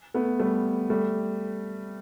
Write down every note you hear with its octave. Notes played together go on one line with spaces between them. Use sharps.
A3 B3
G3 A3
G3 A3